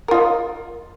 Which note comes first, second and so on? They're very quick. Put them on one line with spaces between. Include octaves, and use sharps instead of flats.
A#4 F4 D#5